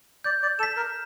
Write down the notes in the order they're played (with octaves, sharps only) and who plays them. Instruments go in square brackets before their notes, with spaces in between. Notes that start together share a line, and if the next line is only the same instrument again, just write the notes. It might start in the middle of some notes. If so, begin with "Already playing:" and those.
[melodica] D5 [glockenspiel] G6
[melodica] D5
[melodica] A4 [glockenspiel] E7
[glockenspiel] B6
[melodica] A#4